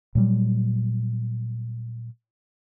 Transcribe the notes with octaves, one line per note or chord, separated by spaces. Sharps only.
A#2 F#3 G3